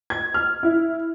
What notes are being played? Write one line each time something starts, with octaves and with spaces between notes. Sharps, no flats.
G#6
F6
E4